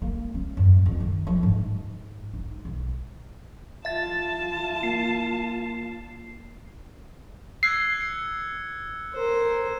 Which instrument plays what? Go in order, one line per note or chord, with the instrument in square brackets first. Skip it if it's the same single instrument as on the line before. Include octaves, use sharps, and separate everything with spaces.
[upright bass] A#3
C#4
F#2
F2
D#3
F3
G#2
D#4
B1
[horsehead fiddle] F4 A5 [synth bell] E5 A6
[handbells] A#3 [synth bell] C7
[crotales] E6 F#6 G#6 [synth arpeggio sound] C7
[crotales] C#7
[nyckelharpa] A#4 C5